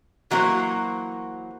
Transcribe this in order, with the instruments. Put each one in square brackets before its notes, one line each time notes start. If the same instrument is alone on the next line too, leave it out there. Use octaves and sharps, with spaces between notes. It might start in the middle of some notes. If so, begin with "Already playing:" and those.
[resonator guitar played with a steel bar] E3 F#3 G3 A#3 F#4 C5